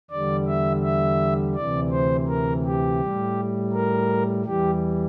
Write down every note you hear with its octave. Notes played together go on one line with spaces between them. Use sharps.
E2 D3 G3 D5
E5
E5
D2 C3 E3 D5
C5
A#4
G4
A2 G3
A#4
E2 E3 G3 G4